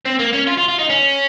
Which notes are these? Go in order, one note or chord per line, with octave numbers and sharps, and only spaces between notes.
C4
A#3
C#4
F4
F4
F4
D#4
C#4